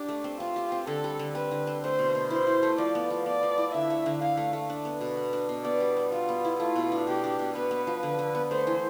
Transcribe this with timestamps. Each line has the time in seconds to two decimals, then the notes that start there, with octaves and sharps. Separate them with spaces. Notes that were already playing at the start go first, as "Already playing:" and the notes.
Already playing: D4 G4
0.08 A3
0.24 C4
0.40 C4 F4
0.56 G4
0.72 C4
0.87 D3 A4
1.04 G3
1.19 D3
1.35 C4 B4
1.51 D3
1.67 C4
1.83 A3 C5
1.99 B2
2.15 B2
2.30 E4 C5
2.47 E4
2.63 A3
2.78 F3 D5
2.95 B3
3.10 F3
3.26 B3 D5
3.43 F3
3.58 E4
3.74 D3 E5
3.90 A3
4.06 D3
4.22 D3 F5
4.37 A3
4.53 A3
4.70 D4
4.85 B3
5.01 B2
5.17 B3
5.33 D4
5.49 B2
5.64 B3 D5
5.80 G3
5.97 G3
6.12 G3 F4
6.29 B3
6.45 E4
6.60 A3 F4
6.75 B2
6.92 D4
7.07 B2 G4
7.24 D4
7.39 B2
7.55 B3 B4
7.71 B3
7.87 F3
8.03 D3
8.19 D3
8.35 B3
8.51 A3 C5
8.67 E3